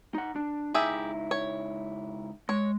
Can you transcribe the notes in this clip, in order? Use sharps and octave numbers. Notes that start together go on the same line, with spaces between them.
D#4 F#5
D4
C#2 D#4 E4 G4 G#4 E5
C#5
G#3 C#5